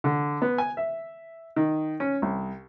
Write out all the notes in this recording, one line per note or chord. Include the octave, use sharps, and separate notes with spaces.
D3
B3
G#5
E5
D#3
C#4
C2